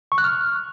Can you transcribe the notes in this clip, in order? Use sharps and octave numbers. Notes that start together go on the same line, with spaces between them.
C#6
F#6
F6